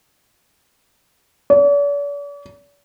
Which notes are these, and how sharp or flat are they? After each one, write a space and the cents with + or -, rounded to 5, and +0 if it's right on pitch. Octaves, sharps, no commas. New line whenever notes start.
D5 -45